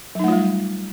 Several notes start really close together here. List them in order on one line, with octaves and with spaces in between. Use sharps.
F#3 D#4 A3 F4 G3